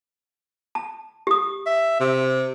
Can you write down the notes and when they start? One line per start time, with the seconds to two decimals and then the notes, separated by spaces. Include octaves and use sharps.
0.75 A5
1.27 G4 D#6
1.66 E5
2.00 C3